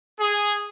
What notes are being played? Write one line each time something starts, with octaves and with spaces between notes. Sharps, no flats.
G#4